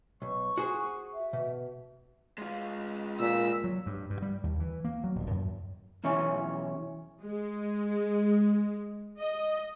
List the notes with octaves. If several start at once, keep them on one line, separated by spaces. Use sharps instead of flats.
B1 C#6
F#4 G#4 C5
E5
B2
G#3 F4
A#2 E6 B6
F#3
G2
G2
G3
D#2
E3
A#3
F#3
D#1
F#2
B1 E3 C#4 C#5
G#3
D#5